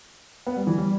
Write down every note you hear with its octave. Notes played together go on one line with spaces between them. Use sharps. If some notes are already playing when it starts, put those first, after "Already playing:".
B3
G3
E3
G3